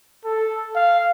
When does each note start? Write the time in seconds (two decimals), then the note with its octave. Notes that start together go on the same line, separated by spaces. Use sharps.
0.25 A4
0.75 F5